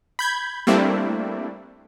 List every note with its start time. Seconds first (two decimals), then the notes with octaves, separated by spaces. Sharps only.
0.19 B5 G6 G#6
0.67 G3 A3 A#3 C4 D4 E4